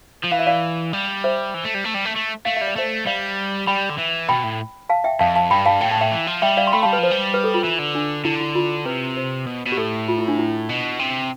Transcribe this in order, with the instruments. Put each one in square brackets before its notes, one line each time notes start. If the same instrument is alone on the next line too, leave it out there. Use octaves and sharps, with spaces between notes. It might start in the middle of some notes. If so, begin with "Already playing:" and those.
[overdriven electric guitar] F3
[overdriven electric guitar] E3 [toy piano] F5
[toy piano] E5
D5 F5
[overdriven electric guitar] G3
[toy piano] C5 E5
[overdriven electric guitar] E3
A3
G3
A3
G3
A3
A3
[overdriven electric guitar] A3 [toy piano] F5
[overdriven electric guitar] G3 [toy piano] E5
[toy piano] D5
[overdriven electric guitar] A3 [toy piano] C5 E5
[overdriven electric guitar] G3 [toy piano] D5 F5
[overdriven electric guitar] G3 [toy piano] G5 B5
[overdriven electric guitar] D3
E3
[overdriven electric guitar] B2 [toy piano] G5 B5
[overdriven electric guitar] A2
[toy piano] F5 A5
E5 G5
[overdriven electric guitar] F2 [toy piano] F5 A5
[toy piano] F5 A5
[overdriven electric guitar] G2 [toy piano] G5 B5
[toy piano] F5 A5
[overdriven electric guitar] A2 [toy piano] G5
[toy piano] A5
E5 G5
[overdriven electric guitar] E3
F3
[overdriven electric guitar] G3 [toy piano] E5 G5
[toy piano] D5 F5
C6
[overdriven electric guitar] A3 [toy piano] G5 B5
[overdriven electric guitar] G3 [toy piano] F5 A5
[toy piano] B4
[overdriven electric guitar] F3 [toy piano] C5
[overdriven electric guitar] G3
[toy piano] B4
A4
F4
[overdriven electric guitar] E3
D3
[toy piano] D4
[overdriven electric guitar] D3 [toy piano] E4
[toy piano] E4
F4
[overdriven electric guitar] C3 [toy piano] B4
[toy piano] C5
[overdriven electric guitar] B2
B2
[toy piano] G4
[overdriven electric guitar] A2 [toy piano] A4
[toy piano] F4
E4
D4
E4
[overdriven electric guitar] B2
C3